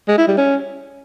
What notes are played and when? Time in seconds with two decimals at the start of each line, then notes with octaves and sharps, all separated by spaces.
0.08 G#3
0.18 E4
0.28 G3
0.37 C#4